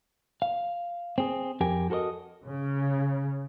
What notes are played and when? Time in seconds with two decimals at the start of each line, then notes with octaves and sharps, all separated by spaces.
0.42 F5
1.18 C4 G#4
1.60 F2 G4 A#4 G5 G#5
1.90 F#4 A4 A#4 C5 D#5
2.46 C#3